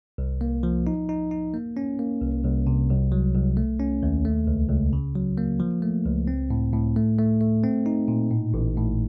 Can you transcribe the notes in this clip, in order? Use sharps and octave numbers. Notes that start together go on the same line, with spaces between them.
C2
A#3
F3
D#4
D#4
D#4
A#3
C#4
A#3
C2
C2
C3
C2
F#3
C2
A3
C#4
D#2
A3
C#2
C#2
C#3
F#3
A#3
F3
A3
C#2
C4
A2
A2
A3
A3
A3
C4
D#4
A#2
A2
A1
A2